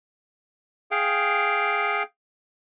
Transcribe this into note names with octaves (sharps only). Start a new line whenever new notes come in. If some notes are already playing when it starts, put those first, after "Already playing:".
G#4 F5 G5